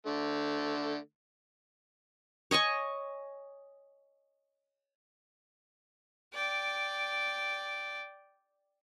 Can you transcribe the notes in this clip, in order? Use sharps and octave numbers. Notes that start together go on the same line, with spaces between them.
D3 A3
C#5 D#5 G#5 C#6
D5 G5